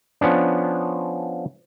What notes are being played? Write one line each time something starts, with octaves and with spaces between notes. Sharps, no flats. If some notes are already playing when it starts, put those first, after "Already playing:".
F3 B3 C#4 D4